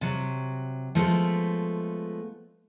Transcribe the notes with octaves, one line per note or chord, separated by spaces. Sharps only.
C3 F#3
F3 G#3 A3 B3